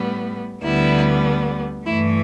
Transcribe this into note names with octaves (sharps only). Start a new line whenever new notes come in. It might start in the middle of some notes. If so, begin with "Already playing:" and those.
Already playing: A2 G3 B3
D2 D3 G3 B3 E4
G2 E3 A3 E4